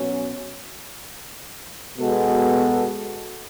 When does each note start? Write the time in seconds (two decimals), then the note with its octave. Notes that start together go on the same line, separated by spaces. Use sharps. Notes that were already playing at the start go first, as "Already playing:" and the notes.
Already playing: B2 F#3 C#4
1.98 B2 G#3 B3 F#4 A4